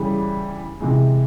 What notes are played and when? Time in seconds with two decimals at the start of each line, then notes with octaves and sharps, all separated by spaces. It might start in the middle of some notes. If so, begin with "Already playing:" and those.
Already playing: C#3 E3 G3
0.80 C3 E3 G#3